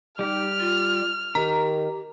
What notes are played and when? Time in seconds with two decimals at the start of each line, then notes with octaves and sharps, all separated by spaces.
0.19 G3 D#4 G4 F6
0.60 F4
1.35 D#3 G4 A#5